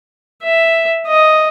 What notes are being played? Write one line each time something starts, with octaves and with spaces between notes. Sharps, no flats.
E5
D#5